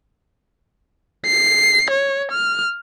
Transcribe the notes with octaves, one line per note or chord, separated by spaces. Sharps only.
C7
C#5
F6